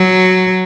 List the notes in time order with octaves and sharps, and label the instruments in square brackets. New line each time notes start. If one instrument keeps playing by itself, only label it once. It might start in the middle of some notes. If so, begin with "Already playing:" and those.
Already playing: [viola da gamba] F#3